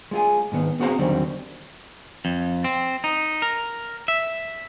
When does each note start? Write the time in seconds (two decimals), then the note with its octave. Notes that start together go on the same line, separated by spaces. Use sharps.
0.11 G#3 F4 G#4
0.52 G#2 D#3 B3
0.80 B3 C4 F#4 G#4 F5 A#5
0.99 E2 D3 D#3 F#3 G3 C4
2.25 F2
2.64 C4
3.04 D#4
3.42 A#4
4.08 E5